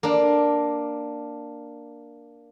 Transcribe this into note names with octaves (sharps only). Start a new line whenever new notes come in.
A#3 D4